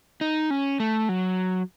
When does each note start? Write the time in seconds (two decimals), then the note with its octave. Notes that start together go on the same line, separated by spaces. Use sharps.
0.21 D#4
0.51 C#4
0.80 A3
1.09 F#3